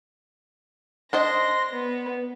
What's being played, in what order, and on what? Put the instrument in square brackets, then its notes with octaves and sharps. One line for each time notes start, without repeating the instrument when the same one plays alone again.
[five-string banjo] D4 C5 D#5 [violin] C6 A#6
[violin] B3